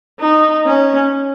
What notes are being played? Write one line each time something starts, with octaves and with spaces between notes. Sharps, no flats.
D#4
C#4